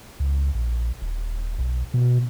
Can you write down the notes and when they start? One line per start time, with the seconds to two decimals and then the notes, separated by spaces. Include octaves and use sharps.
0.20 C#2
0.55 A#1
1.02 D#1
1.58 B1
1.94 B2